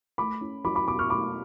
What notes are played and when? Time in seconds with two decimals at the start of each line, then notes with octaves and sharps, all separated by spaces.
0.18 A3 B5 D6
0.41 C#4
0.64 F#3 B5 D6
0.75 B5 D6
0.87 B2 B5 D6
0.99 C#6 F6
1.10 A3 B5 D6